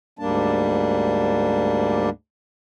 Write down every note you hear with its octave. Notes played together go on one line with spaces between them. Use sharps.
D2 G#2 G3 A#3 D4 A5